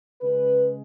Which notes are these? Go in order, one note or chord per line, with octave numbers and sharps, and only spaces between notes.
C#3 G#3 B4